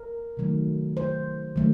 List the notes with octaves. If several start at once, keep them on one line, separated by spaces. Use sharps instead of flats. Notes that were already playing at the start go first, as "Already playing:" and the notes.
Already playing: A#4
C3 D#3 F#3 A3
C5
D#3 F#3 A3